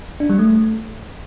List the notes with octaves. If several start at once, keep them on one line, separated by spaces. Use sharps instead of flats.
D4
G3
A3